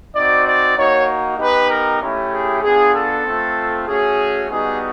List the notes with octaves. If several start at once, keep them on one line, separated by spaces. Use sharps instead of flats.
C4 D#4 F#4 D5
D5
A#3 D#4 F#4 C#5
B3 D#4 G4 B4
A#4
A3 C#4 E4 G4
G#4
B3 D4 F4 G#4
A4
A3 C4 F4
A3 C#4 F#4 G#4
G3 B3 D#4 F#4 G#4